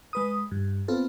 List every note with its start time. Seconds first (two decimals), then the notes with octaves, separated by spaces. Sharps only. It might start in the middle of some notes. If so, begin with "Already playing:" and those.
0.13 G#3 B4 D#6
0.51 G2
0.88 B3 C4 F4 A4